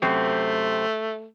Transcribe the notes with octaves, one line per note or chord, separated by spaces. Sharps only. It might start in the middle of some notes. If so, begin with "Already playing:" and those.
F#2 C3 A3 C4